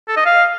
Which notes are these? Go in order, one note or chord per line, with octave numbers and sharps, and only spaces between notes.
A4
D#5
F5